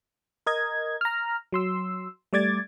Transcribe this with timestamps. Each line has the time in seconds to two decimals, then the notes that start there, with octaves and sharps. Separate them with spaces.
0.46 A#4 D#5 G#6
1.01 A#5 F6
1.53 F#3 C6 E6
2.33 G3 A3 D5 D6 G#6 A6